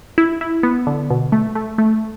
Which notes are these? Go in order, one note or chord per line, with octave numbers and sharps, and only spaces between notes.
E4
E4
B3
D3
B2
A3
A3
A3